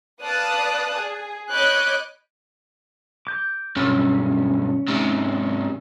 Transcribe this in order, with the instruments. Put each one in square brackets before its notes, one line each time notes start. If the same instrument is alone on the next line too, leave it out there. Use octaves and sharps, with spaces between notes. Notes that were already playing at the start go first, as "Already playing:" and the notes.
[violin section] B4 D5 F5 A5 D#6 F#6
G#4
C#5 D#5 B5 D6 F#6 G6
[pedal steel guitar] D6 G6
[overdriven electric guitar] B1 G2 [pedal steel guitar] C#4
[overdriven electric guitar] G#2 C3